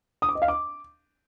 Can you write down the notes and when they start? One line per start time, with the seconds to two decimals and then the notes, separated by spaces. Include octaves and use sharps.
0.22 D#6
0.29 D6
0.35 D#5
0.42 F5
0.48 D6